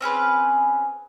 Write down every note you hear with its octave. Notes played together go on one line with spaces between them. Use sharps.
C4 C#4 G#4 B4